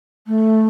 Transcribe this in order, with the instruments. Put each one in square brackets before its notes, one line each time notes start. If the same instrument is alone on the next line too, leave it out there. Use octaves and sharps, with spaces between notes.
[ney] A3